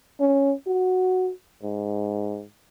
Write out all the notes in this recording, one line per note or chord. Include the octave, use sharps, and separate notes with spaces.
C#4
F#4
G#2